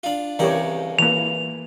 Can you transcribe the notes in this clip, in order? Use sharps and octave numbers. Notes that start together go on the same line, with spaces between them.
D4 F4
C2 C#3 E3 G4 A#4 C#5
E3 A#3 F7